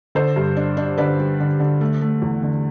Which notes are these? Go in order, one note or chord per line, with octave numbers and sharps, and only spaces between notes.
D3 A4 C5
G2
D4
D4
D3 B4 D5
G3
D3
D3
A3
A3
E2
D3